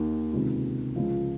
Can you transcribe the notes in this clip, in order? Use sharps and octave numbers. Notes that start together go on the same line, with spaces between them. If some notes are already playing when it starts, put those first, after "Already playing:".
Already playing: D#2 D#3
C#2 C3 D#3
C#2 C#3 F3